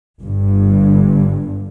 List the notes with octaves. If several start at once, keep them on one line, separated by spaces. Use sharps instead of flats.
G1 G2 D3